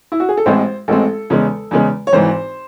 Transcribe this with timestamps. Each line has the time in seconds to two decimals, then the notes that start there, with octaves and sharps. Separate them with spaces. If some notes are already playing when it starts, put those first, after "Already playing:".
0.12 E4
0.20 F#4
0.29 G#4
0.37 A4
0.46 A1 A2 G#3 C4 C5
0.88 A1 A2 G#3 C4 A4
1.30 E2 C#3 G#3
1.71 E2 C#3 G#3
2.07 C#5
2.13 G#1 G#2 E3 C5